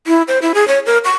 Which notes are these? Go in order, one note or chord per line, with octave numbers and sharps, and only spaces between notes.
E4
C5
E4
G#4
C#5
A#4
C#6